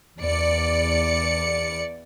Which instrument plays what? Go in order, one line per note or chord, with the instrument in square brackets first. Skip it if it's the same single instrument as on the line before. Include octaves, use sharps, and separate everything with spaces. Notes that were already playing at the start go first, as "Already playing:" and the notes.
[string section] E2 D5 C#7